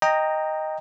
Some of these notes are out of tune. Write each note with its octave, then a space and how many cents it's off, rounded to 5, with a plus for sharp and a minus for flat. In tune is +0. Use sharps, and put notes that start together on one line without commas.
D#5 +0 G5 +10 A#5 -10